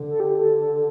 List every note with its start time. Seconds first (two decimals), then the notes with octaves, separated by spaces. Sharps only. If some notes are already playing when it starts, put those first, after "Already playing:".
Already playing: D3
0.09 A4
0.20 G4
0.38 A4
0.58 A4